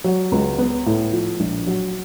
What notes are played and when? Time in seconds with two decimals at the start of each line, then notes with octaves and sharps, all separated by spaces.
0.04 F#3
0.32 C#2
0.58 B3
0.86 A2
1.12 F3
1.40 A#1
1.67 F#3